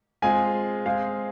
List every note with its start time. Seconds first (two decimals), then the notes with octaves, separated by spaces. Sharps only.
0.22 G#3 C4 F4 G#4 G#5
0.86 G#3 C4 G#4 F5